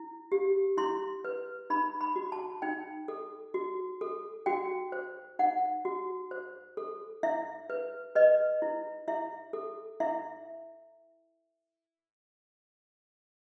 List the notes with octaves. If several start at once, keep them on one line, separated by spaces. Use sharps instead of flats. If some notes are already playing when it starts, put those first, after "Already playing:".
Already playing: E4
G4
E4 C6
B4
D#4 B5
B5
F#4
A5
D#4 G5
A4
F#4
A4
F#4 G5
C5
D#4 F#5
F#4
C5
A4
E4 E5
B4
B4 D#5
E4
E4 E5
A4
E4 E5